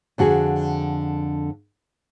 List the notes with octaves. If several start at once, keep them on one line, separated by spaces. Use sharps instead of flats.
F2 D3 F#4 G#4